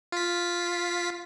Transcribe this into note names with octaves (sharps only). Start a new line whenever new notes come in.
F4 B6